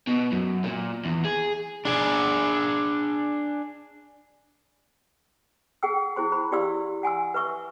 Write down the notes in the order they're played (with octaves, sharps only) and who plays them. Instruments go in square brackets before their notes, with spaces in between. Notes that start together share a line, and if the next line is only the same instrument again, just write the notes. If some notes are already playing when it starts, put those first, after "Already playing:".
[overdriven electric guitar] B2
F#2
A#2
E2
G#4
[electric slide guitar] D4 G#4
[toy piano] G#4 F#5 G5 E6
E4 G#4 C5 C6
C5 B5
E4 G4 D5 F5 C6 E6
F#5 G#5 C6 E6
B4 E5 C#6 E6